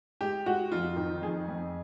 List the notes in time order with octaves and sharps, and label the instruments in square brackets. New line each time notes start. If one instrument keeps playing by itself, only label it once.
[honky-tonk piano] G#3 [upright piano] G4
[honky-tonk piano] G#3 [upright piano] F#4
[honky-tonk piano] F2 [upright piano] F4
[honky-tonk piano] D#3
[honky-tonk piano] F2 [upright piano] G#4
[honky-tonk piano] F2